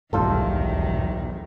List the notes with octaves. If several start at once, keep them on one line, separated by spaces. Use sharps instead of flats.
D#1 B1 E2 G#2 D#3 G3 F4 A4